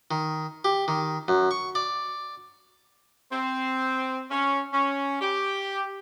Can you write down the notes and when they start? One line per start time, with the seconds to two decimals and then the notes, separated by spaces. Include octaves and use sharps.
0.11 D#3
0.65 G4
0.88 D#3
1.28 F#2
1.51 C#6
1.75 D5
3.32 C4
4.31 C#4
4.73 C#4
5.21 G4